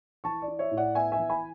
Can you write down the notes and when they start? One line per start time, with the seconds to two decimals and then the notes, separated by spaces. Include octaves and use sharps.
0.24 E3 A5 C#6
0.42 D5
0.48 E4
0.59 C#5 E5
0.71 A2
0.77 D5 F#5
0.95 B3 E5 G#5
1.12 E5 G#5
1.18 E3
1.30 G#5 B5